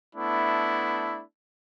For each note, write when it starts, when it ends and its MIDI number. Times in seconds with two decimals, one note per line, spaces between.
0.14 1.22 57
0.14 1.22 59
0.14 1.22 62
0.14 1.22 64